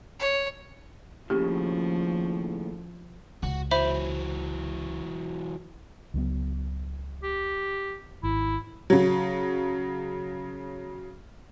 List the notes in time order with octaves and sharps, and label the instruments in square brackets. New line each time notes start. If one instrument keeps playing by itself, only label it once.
[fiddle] C#5
[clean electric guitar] D#2 A2 C#3 [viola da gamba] F3 [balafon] G4
[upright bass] C#2 [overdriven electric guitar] F#4
[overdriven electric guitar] E3 F#3 [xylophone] C5 E5 B5
[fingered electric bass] C#2 F#3 B3
[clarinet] G4
[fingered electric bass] G#1 [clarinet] E4
[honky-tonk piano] C#3 F#3